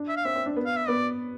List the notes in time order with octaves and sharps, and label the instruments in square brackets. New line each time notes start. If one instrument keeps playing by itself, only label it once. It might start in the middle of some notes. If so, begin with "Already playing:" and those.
Already playing: [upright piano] D4
[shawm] E5
F5
[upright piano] C4 [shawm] E5
[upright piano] C4
D4
B3
[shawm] F5
E5
[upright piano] B3 [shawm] D5